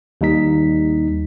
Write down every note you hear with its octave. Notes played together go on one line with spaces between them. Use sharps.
D#2 G3 D#4 B6